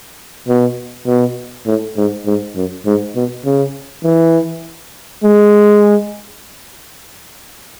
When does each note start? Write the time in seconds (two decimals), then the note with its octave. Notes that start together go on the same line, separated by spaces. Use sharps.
0.48 B2
1.07 B2
1.66 A2
1.97 G#2
2.26 G#2
2.56 F#2
2.85 G#2
3.16 B2
3.45 C#3
4.04 E3
5.24 G#3